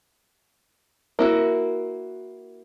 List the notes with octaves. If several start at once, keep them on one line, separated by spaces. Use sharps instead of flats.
A#3 E4 F#4